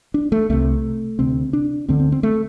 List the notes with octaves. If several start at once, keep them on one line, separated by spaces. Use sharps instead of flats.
D4
A3
C2 C3 A3
D2 C3 C4
D4
D2 D3 C4
C4
C4
A3